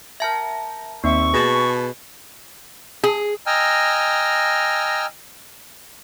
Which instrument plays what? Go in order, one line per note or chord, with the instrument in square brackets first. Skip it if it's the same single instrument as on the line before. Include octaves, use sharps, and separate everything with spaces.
[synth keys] A#4 G5 A#6 [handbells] E5 A5
[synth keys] D#2 C4 E5 [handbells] A#3 [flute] C#6
[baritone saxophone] B2 [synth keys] G#4 A5 B5 [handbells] A#6
[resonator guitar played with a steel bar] G#4
[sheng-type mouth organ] D#5 G5 G#5 A#5 E6 F6